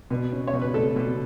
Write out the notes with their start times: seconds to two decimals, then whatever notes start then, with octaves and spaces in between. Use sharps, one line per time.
0.11 B2
0.32 C#4
0.47 C#5
0.53 B2
0.62 B4
0.74 A3 A4
0.96 B2